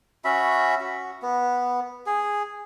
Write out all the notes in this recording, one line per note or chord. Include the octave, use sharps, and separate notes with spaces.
C#4 F#4 E5 B5
F#4
B3
G#4